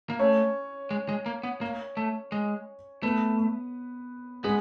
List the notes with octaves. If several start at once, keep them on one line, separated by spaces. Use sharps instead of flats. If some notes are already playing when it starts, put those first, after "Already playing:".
A#3
A3 C#4 C#5
G#3
G#3
A#3
B3
A#3
A3
G#3
A3 B3 B4
G#3 B3 G#4